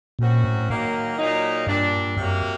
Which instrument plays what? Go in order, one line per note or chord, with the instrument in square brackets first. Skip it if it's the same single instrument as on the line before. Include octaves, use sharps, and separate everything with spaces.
[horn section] F#2 F#3 C4 F#4 [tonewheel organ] A#2
[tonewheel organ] A2
[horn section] D#3 F#3 A#3
A#2 F#3 A#3 D#4
[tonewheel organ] G2 [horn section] A#2 G3 D4
[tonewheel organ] F#2 [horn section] C3 F#3 A#3